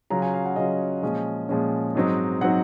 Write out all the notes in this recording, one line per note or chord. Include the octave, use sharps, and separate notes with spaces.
C#3 F#3 C#4 F4 A#5
G#5
F5
F#5
C#3 F#3 C#4 F4 D#5
A#2 F3 G#3 C#4
A#2 F3 G#3 C#4
G#2 F#3 C4 D#4
F#3 C4 D#4 F#5